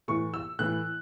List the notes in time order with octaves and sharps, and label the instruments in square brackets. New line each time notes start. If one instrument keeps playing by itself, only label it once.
[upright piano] A2 E3 C#6
E6
A2 E3 F#6